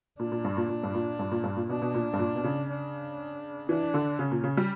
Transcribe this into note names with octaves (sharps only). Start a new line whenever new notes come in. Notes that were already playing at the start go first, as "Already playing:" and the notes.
A#2 D4
A#2
G2
A#2
A#2
G2
A#2
G2
A#2
G2
A#2
B2 D4
B2
A#2
G2
A#2
B2
C#3
D4
E3 D4
D3
C#3 C#4
A#2
C#3
G3